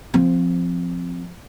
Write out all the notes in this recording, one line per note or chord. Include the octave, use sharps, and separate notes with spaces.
F3 C4